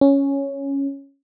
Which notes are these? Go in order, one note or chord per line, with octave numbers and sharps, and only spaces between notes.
C#4